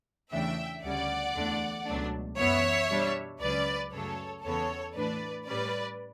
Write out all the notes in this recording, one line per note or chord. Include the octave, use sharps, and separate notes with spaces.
E2 C#3 E3 A3 D4 E5 G5
D2 C#3 G3 C#4 D5 F#5
E2 D3 A3 D4
C#2 B2 F#3 A3 D4
F#2 E3 B3 C#5 E5
B2 G3 D4
C#2 C#3 F#3 C#4 B4 D5
F#2 C#3 F#3 A3 A4 C#5
E2 C#3 E3 B3 A4 C#5
A2 E3 A3 D4 B4 D5
A2 G3 C#4 B4 D5